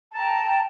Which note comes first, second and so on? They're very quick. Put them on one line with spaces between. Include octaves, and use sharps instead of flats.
A5 A#5 G5